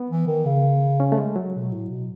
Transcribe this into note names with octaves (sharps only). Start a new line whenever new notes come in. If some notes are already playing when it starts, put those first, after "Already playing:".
Already playing: B3
E3
D#3
C#3
C#4
A3
G#3
F#3
B2
A2
B2